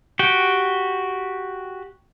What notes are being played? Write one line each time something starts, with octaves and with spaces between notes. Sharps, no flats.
F#4 G4 G5